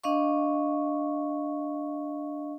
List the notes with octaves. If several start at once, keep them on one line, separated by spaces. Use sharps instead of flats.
D4 D#5 F5 C#6